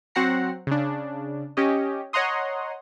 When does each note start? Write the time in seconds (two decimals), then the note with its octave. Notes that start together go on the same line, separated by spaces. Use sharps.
0.15 F#3 C4 F#4 F#5 A#5 C7
0.67 C#3 D4
1.57 C#4 G4 C#5 D#5
2.13 C#5 D#5 F#5 A#5 C6 D#6